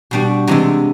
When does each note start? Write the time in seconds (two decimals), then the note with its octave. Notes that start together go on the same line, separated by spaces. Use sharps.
0.11 B2 G3 B3 D4 F#4
0.47 C3 E3 G#3 B3 D4